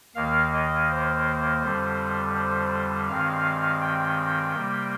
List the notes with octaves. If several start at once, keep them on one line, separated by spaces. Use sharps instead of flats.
D#2 D#3 A#3 F5
D#5
C5
F2 D3 G3
C5
G2 D#3 G#3 C4 F5
G5
C3 G3 A#3